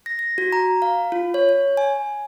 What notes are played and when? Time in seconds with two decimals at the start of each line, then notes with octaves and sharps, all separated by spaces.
0.06 A#6
0.19 A#6
0.38 F#4
0.52 A#5
0.82 F5
1.12 F4
1.34 C#5
1.49 C#5
1.77 G#5